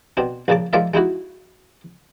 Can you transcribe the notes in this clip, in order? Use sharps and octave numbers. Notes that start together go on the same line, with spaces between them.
B2 C4 D4
A#1 A#2 C#3 A5 D6
F3 G#3 A#3 A#4 D5 E5
G#3 D#4 E4 F#4